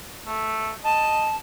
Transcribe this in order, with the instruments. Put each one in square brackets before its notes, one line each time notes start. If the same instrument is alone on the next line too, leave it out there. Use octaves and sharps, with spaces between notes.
[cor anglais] A3
[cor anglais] D#5 [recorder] A5